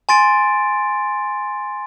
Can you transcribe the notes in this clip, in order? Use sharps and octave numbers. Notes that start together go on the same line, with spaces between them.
G#5 C6 A6 D7